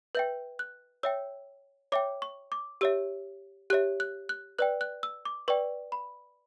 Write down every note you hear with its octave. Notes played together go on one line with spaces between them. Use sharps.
B4 E5 G5 G6
F#6
C#5 E5 G5 E6
C#5 E5 G5 D6
C#6
D6
G4 C#5 E5 E6
G4 C#5 E5 F#6
F#6
F#6
B4 D5 G5 F#6
F#6
E6
D6
B4 D5 G5 C#6
B5